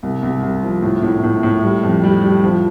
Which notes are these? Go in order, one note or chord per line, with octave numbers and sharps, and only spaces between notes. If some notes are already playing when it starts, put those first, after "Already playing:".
C2
C2
C2
F3
A2
A2
A2
A2
G3
F2
G3
G3
F3